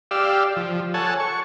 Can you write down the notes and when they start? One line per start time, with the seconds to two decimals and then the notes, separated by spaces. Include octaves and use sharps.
0.11 G4 D5 F5 E6
0.57 F3
0.94 A4 C#5 F#5 G#5 A5
1.20 C#6